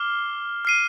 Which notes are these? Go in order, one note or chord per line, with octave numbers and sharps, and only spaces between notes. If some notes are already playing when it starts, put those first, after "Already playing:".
Already playing: D6 F6 C7 G7
F6 C7 D#7